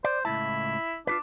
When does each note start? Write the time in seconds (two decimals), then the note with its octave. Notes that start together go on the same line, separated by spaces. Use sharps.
0.04 C5 D5
0.25 C#2 A2 E4 A5
1.07 D4 F4 F#4 B4